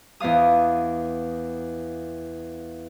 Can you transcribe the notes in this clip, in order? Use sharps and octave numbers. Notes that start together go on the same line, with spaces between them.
E2 B3 D5 F5 D#6